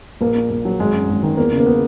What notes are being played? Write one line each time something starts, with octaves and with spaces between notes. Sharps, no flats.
A#1 A#3
A#2
A#1
F#3
G#1 G#3
F#2
G#1
D#3
E2 A#3
C#3
A#3
B3